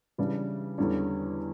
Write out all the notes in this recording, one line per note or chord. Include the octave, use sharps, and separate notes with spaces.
C#3 E3 G3 D4
E2 D3 G3 C#4